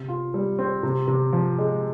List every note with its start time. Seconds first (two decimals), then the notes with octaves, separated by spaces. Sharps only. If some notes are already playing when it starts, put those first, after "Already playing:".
Already playing: C3
0.08 F4
0.34 G3
0.59 C4
0.83 C3
1.08 C3
1.33 F3
1.59 G#3